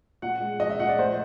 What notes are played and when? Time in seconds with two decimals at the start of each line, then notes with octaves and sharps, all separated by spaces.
0.22 A#2 F#5
0.40 G#3
0.60 F3 D#5
0.70 E5
0.80 A#2 F#5
0.89 D5
0.99 A3 C5